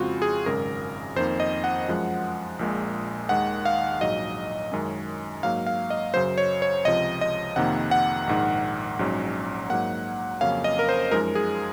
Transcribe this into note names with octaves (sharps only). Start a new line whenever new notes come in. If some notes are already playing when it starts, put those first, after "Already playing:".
Already playing: F2 C#3 G#3 C4 F4 F#4
G#4
G#1 F#2 C#3 G#3 A#4
F2 D#3 A#3 D#4 C5
D#5
F#5
F#2 F3 G#3
A#1 A#2 G#3
D#2 D#3 G#3 F#5
F5
A#1 G#2 F#3 D#5
F#2 D#3 G#3 C#4
G#2 F#3 A#3 F5
F5
D#5
F#2 C#3 F#3 C5
C#5
C#5
C#2 C3 F3 D#5
D#5
F2 C3 D#3 A#3 F#5
F#5
A#1 G#2 D#3
A#1 G#2 F#3 C#4
G#2 F#3 A#3 F#5
F2 C#3 F#3 A#3 C#4 F5
D#5
A#4
C5
F#2 F3 G#3 D#4 A#4
G#4